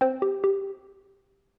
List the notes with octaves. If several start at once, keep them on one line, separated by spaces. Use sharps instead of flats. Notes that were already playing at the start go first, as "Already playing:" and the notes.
C4 C5
G4
G4